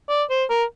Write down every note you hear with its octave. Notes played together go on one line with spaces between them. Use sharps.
D5
C5
A#4